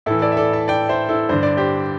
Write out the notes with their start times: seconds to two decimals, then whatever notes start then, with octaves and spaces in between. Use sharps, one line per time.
0.06 A2 E3 E4 A4
0.22 A4 D5
0.32 E5
0.37 A4 D5
0.53 E5 A5
0.68 D5 G5
0.89 C5 E5
1.09 E4 A4
1.29 G2 D3 C5
1.43 D5
1.57 G4 C5